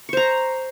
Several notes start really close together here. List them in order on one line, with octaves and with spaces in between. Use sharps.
C#6 C5 A#5